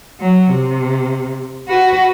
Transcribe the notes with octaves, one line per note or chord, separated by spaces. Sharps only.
F#3
C3
F#4 B4